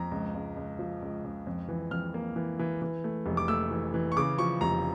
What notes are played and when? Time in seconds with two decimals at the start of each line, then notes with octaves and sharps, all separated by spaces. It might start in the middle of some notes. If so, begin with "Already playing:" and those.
Already playing: F2 A#5
0.11 C#2
0.34 C#2
0.57 C#2
0.79 F3
1.02 C#2
1.24 C#2
1.47 F2
1.69 E3
1.91 F2 F6
2.14 A#3
2.36 E3
2.59 E3
2.82 E3
3.04 A3
3.26 F1
3.37 D6
3.48 A3 E6
3.71 E3
3.94 E3
4.12 C#6
4.16 C#3 D6
4.38 F3 C#6
4.61 F1 A#5